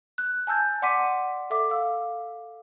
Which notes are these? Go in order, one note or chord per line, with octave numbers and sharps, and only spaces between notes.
F#6
G#5 A5 E6 G6 A6
D5 F#5 C6 D6 B6 D#7
A4 E5 D6
F5 E6